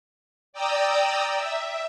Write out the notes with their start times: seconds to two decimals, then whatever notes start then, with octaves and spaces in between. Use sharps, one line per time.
0.53 D5 G5 A#5 D#6 E6
1.37 E5